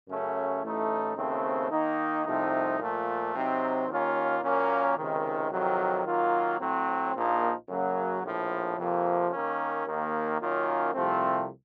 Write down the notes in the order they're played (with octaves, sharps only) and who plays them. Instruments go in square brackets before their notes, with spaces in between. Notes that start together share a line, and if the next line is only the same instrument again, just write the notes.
[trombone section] F#2 C#3 A3 C#4
A1 A2 A3 D#4
D#2 C#3 A3 C4
D#3 A#3 D#4
C2 C3 F3 A3 D#4
A#2 F3 A3
C3 F#3 C4 D#4
D#2 D#3 A#3 C#4 F4
A#2 F#3 A#3 C#4
C#2 C3 D#3
F2 C3 D#3 F#3
D#3 F#3 A#3 F4
A2 F#3 C4
A#1 A#2 F3 A#3 D#4
F#2 C#3 F#3 A#3
A#1 A2 F3
F2 C3 F3 A#3
D#3 A#3 C#4
D#2 D#3 A#3
F#2 D#3 A#3 C#4 F4
C2 C3 F3 A3 C4